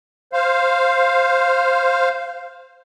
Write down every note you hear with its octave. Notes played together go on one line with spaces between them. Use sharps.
C5 F5